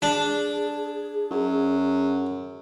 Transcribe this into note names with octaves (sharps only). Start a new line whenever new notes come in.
D4 G#4
F#2